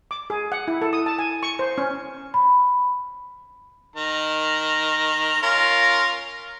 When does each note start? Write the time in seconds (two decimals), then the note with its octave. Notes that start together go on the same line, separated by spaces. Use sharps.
0.11 D6
0.30 G#4
0.52 F#5
0.68 E4
0.82 A4
0.93 D#6
1.06 A5
1.19 G#5
1.43 C#6
1.59 C5
1.78 C#4
2.34 B5
3.96 D#3 A#5
5.42 C#4 F4 A#4